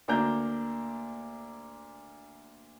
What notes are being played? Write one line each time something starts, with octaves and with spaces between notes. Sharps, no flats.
D2 A#3 D4 A#5 G6